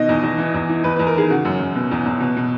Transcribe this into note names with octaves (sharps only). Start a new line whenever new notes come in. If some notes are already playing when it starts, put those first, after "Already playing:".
Already playing: B2 D#3 D#5
E2
E2
E3
E2
E3
E2 B4
E2 B4
A#4
D#3 G#4
C#3 F#4
F#2
F#2
B2
E2
E2
B2
B2